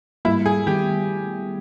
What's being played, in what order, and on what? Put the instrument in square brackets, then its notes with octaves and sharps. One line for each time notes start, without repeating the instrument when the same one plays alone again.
[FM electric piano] G#2 G3 A#3 [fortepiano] E4
[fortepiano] G#4
[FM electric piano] D#3 G3 B3 [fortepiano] G4